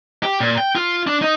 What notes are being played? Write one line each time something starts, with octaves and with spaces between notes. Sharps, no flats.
G4
A#2
G5
F4
D4
D#4